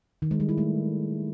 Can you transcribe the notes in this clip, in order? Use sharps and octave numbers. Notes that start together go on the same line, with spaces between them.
D#3
G#3
G3
E4
A3